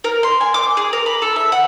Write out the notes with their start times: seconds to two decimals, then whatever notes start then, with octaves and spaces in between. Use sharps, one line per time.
0.04 A#4
0.23 C6
0.41 G#5
0.54 D6
0.77 G#4
0.93 A#4
1.06 B5
1.22 A4
1.36 E5
1.52 F#5